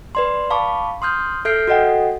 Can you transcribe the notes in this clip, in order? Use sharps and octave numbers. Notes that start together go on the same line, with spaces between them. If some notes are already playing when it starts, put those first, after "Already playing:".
B4 D5 C6
F5 A5 B5 C#6 D6
C6 D#6 F6 G6
A4 E5 F6 G6 C7 D7
F#4 A4 D#5 F#5 G5